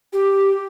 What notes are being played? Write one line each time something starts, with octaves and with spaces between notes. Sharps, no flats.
G4